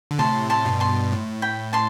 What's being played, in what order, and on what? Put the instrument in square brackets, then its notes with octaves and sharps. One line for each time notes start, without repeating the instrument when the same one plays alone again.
[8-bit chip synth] D3
[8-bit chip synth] A2 C3 [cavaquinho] A5 C6
[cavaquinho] A5 C6
[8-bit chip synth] G2 B2
[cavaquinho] A5 C6
[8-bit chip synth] A2
[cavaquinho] G5 B5
A5 C6